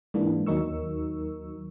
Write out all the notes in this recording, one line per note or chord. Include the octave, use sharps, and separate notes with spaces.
G#2 E3 A#3 D4
D#2 F#3 D#4 A#4 C#6 E6